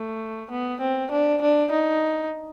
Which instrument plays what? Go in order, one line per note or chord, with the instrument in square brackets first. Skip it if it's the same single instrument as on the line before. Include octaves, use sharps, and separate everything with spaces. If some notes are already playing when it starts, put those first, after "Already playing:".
Already playing: [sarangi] A3
B3
C4
D4
D4
D#4